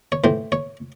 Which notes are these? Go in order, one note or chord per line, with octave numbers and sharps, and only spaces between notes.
C#5
A2 E3 C5
C#5